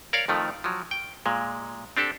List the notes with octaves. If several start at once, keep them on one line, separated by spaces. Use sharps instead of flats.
A#4 C#5 D5 F5
F2 D#3 F3 A3
F3 F#3
G5
A#2 G#3
C4 D4 G4 A4